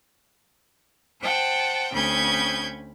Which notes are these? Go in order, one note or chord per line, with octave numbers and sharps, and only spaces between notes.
C5 F#5 G5 A5
D2 C4 C#4 B5 G6 G#6